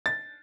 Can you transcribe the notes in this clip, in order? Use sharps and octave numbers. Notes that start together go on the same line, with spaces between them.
A6